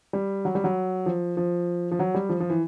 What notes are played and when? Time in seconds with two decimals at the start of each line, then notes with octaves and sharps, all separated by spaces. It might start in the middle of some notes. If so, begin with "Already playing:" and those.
0.13 G3
0.45 F#3
0.55 G3
0.64 F#3
1.06 F3
1.37 F3
1.91 F3
1.99 F#3
2.14 G3
2.29 F3
2.40 F3
2.50 E3